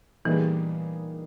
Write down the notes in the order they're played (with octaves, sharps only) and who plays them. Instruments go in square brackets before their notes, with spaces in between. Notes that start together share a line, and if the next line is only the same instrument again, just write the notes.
[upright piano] A#2 G3 B3 D#4 G#4 [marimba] E3